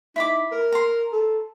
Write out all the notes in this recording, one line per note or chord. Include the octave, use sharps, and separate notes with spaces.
D#4 E4 B5 D6
A#4
A#5 C6
A4